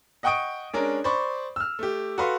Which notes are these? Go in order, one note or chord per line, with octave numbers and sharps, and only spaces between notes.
D#5 F#5 G5 C#6 D#6 D7
G#3 C#4 D4 A#4
C5 D5 B5 C#6
E6 F6
A3 G4
F#4 A4 B4 F5 C6